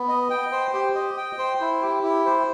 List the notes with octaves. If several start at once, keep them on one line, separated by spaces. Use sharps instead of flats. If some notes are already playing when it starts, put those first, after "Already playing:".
Already playing: B3
D#5
G5
C5
G4
D#5
G5
C5
E4
G4
E4
C5